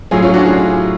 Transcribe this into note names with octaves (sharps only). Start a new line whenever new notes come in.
A2 F#3 F4 G#4
C#4 F4
D4 F#4
F4 G#4